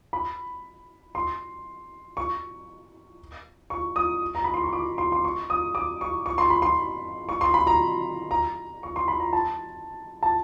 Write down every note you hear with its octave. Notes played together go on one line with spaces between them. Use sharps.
B5
C6
C#6
C#6
D#6
A#5
B5
C6
C#6
D6
C6
C6
C#6
D#6
D6
C#6
C#6
C6
B5
C6
C#6
C6
B5
A#5
A#5
C#6
C6
B5
A#5
A5
A5